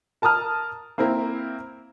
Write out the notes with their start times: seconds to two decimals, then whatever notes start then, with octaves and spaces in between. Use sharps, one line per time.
0.22 A#4 A5 A#5 D#6 F6
0.98 A#3 C4 E4 A#4